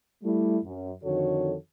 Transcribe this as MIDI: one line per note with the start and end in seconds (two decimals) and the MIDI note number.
0.23 0.57 55
0.23 0.57 57
0.23 0.57 64
0.64 0.93 42
1.04 1.54 41
1.04 1.54 50
1.04 1.54 51
1.04 1.54 66
1.04 1.54 69
1.04 1.54 73